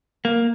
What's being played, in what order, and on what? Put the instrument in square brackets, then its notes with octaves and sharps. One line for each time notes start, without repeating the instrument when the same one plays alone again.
[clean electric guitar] A#3